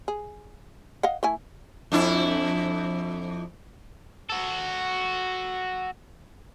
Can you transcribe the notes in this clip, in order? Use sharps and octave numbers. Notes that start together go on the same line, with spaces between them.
G#4
D#5 F5 F#5
A3 E4 G#5
F2 D4 E4
F#4 A4